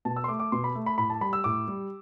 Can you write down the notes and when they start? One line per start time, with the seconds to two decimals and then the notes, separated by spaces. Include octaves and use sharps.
0.05 B2 A5
0.16 E6
0.24 C6
0.28 A3 D6
0.39 D6
0.52 B2 C6
0.64 B5
0.75 A3
0.86 B5
0.98 A2 B5
1.10 A5
1.21 G3 B5
1.33 E6
1.44 A2 D6
1.68 G3